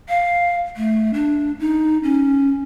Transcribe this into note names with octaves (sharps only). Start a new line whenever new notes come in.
F5
A3
D4
D#4
C#4